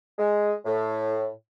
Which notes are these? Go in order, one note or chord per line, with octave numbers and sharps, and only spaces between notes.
G#3
A2